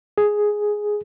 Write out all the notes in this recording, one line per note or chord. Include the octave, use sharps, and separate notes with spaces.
G#4